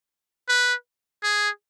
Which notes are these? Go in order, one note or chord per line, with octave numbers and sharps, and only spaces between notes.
B4
G#4